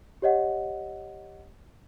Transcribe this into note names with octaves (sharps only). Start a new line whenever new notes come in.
G4 C#5 D#5 F#5